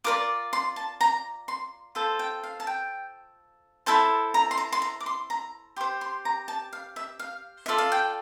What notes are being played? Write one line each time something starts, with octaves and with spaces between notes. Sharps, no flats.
F4 A#4 D5 D6
C6
A5
A#5
C6
F4 A4 C5 A5
G5
F5
A5
G5
E4 A4 C5 A5
A#5
C6
A#5
C6
A#5
D6
C6
A#5
G4 C5 C6
C6
A#5
A5
F5
E5
F5
F4 A4 D5 E5
F5
G5